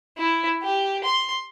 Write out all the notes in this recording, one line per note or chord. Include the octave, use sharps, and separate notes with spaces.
E4
G4
C6